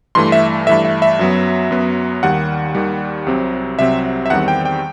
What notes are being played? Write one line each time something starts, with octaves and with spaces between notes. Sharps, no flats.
G2 E3 A3 C6
E5
G2 E3 A3 E5
E5
E5
F#2 F#3 B3
F#2 F#3 B3
D#2 D#3 G3 F#5
D#2 D#3 G3
C2 C3 F#3 C4
C2 C3 F#3 C4 E5
E5
E2 D#3 G3 C4 F#5
G5
G5